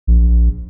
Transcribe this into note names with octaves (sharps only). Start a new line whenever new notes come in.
A#1